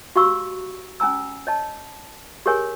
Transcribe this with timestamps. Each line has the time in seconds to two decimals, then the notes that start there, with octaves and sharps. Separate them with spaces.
0.16 F#4 G4 F5 B5 C#6 E6
1.00 C#4 G#5 A#5 E6
1.47 C#5 D#5 A5
2.46 G4 G#4 A#4 C#5 G#5